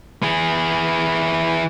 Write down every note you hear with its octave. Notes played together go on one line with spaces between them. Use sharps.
E3 G#4